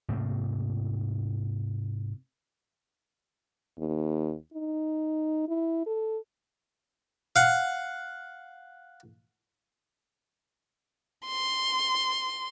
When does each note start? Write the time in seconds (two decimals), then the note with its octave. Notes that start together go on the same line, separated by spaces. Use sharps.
0.09 G#2 C3 A3 A#3
3.79 D#2
4.53 D#4
5.48 E4
5.86 A4
7.36 F5 F#5
11.27 C6